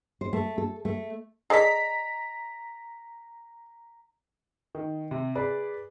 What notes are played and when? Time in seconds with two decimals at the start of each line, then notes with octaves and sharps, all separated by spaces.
0.21 C5
0.33 A3
0.58 A4
0.85 A3
1.50 G#4 A4 D5 D#5 A#5 B6
4.75 D#3
5.11 C3
5.35 G#4 B4 D5